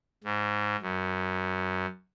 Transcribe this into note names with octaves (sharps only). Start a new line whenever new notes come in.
G#2
F#2